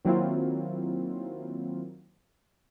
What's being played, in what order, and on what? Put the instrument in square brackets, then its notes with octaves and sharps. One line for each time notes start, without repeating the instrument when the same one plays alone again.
[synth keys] D#3 F#3 A#3 C4 E4 F4